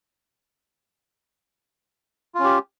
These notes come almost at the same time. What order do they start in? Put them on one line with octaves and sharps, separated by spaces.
F4 C#4 G4